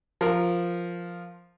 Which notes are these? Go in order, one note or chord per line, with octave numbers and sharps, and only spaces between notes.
F3 A#4